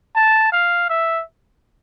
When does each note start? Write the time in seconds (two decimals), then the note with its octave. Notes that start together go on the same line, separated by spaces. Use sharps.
0.16 A5
0.52 F5
0.90 E5